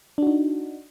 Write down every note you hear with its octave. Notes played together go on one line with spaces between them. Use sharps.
D4 D#4 F#4